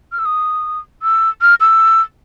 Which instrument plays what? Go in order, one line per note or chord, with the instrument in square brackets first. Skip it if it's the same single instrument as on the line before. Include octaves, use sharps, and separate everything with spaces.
[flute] F6
E6
D#6
E6
F6
E6